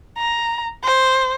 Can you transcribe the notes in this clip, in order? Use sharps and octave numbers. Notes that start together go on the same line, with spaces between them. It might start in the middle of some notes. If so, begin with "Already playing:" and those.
A#5
C5